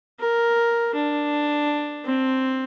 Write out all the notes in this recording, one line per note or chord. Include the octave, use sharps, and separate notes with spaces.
A#4
D4
C4